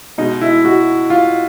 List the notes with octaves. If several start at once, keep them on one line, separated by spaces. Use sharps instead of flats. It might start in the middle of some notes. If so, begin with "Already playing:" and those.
B2 G#3 D#4
E4
F#4
F4